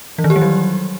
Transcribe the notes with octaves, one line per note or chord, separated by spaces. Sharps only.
E3
D#3
G4
G3
F#3